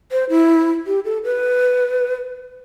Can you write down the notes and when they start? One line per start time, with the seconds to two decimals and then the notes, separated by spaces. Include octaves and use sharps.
0.12 C5
0.30 E4
0.87 G4
1.05 A4
1.24 B4